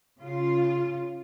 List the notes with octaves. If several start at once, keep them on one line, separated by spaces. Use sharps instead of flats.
C#3 F4